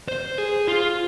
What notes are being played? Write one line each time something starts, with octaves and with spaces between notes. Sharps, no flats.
C5
G#4
F4